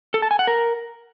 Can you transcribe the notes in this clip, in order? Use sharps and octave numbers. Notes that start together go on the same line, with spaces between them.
A4
A5
G#5
F#5
A#4